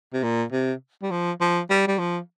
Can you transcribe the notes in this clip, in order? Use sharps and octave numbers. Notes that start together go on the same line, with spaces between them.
C3
A#2
C3
G3
F3
F3
G3
G3
F3